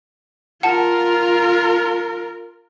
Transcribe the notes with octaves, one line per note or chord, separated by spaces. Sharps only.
F4 A#4 F#5 A5